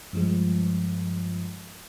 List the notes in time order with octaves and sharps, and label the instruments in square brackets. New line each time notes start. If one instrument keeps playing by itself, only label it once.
[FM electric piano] G2 F3 G#3